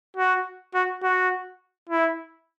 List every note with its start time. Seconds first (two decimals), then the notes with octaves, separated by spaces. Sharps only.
0.17 F#4
0.75 F#4
1.03 F#4
1.89 E4